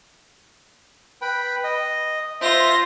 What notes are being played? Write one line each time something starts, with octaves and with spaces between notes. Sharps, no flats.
B4 G5 B5
D#5
F4 C5 E5 A#6